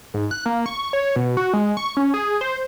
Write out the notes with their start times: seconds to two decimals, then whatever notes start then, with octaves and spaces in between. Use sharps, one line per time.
0.14 G#2
0.31 F#6
0.46 A#3
0.66 C#6
0.93 C#5
1.16 B2
1.37 F#4
1.53 G#3
1.77 C#6
1.97 C#4
2.14 G#4
2.41 C5